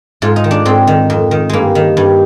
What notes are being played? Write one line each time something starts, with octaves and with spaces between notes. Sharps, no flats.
G#2 F4
D#4
D#3
D4
G#2 C4
D#3
F2
D#3
G2 G#3 A#3
D#3
G2